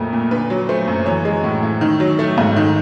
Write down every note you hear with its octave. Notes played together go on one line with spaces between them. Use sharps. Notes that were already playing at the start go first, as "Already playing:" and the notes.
Already playing: F2 A#2 F#3 A3 A#4
A#2
D3 B4
F#3
A3 C5
F#2
E3 C#5
G#3
A2
A2
D#3
F#3
A3
G#2
D#3